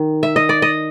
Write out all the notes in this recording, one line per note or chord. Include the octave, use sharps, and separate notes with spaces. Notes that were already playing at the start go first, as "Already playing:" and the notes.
Already playing: D#3
E5
D#5
D5
D#5